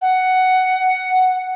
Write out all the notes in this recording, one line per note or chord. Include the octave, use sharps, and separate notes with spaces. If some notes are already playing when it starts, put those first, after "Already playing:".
F#5